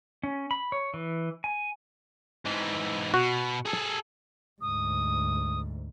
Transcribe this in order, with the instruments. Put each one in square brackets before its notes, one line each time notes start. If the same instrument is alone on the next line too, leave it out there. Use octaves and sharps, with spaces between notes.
[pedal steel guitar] C#4
B5
C#5
E3
G#5
[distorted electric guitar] G#2 E3
[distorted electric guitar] B2 [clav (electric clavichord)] F#4
[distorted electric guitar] G#4 A4
[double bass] D2 G#2 [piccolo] D#6